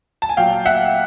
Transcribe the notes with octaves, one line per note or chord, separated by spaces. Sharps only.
A5
G#5
A#2 F#3 F5 G5
E5 F#5